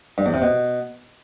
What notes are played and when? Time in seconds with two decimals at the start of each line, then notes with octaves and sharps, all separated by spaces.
0.18 G2
0.26 E2
0.34 C3
0.42 B2